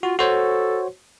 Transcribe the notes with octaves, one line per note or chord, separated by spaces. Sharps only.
F4 F#4
F#4 A4 C5 C#5